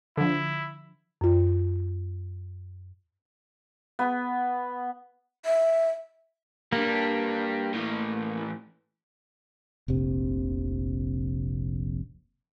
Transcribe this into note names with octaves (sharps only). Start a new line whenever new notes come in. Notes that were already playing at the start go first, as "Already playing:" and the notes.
D3 F3 E4
F#2 F4
B3
E5
G3 A#3 D4
A2 E3
F1 A#1 C3